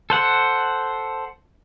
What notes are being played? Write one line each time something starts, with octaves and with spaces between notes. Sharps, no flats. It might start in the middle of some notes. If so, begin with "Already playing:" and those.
A4 C5 F#5